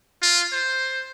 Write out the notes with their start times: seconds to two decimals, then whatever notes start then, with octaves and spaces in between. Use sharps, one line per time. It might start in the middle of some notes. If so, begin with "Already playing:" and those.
0.22 F4
0.52 C5